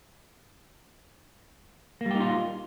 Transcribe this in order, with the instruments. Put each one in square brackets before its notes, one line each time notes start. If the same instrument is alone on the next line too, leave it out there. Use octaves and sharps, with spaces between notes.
[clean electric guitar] A#3
G3
G4
D#4
F4